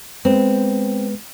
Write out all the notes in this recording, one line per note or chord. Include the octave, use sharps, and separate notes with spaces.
G#3 B3 C4 B4